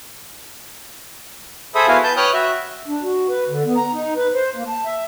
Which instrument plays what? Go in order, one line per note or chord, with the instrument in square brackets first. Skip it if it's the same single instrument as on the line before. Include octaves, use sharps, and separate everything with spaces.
[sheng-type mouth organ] G#4 A4 C5 E5 B5 D#6
B3 E4 F#4 F5 G#5
B4 A5 G6
B4 C#5 G5 D#6 F6 F#6
F#4 E5
[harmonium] D4
F#4
B4
D3
B3
A#5
D#4
B4
C5
A#3
A5
E5